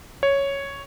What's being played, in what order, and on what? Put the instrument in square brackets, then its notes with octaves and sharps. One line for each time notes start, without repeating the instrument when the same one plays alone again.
[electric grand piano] C#5